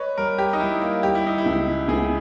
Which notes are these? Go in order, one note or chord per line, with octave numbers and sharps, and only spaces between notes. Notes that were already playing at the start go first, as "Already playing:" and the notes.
Already playing: B4 C#5 D#5
G3 A#4
G4
D#4
G3 E4
A#3
G3 G4
E4
D#4
E4
C#2
C#2 G#4